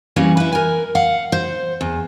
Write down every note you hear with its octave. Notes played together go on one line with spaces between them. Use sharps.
E3 G3 A#3 C#4
E4 B4
A#4 G#5
F5 F#5
C5
E2